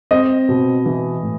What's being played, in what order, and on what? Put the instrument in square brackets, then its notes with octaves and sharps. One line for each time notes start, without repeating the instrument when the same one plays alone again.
[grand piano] C4 [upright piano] D#5
[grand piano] B2
E3
A2